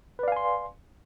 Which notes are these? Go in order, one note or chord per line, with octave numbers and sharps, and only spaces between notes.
B4 D5 F5 G#5 C6